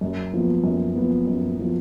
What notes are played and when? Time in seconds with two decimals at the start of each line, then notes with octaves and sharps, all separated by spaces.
0.01 F#2
0.34 F3 B3
0.64 F#2
0.96 F3 B3
1.27 F#2
1.58 F3 B3